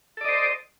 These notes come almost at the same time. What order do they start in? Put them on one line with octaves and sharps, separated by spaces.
A4 D5 D#5 C5